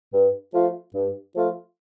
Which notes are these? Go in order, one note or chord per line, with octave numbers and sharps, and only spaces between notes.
G2
F3 A3 F4
G2
F3 A3 F4